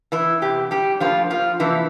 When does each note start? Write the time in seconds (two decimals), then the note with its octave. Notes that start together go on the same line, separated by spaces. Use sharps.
0.12 E3 E4
0.42 E2 C3 G4
0.71 G3 G4
1.00 A2 F3 G3 A#3 F4
1.30 F3 F4
1.60 C3 E3 F3 A#3 E4